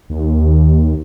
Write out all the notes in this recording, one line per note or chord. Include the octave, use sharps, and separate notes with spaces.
D#2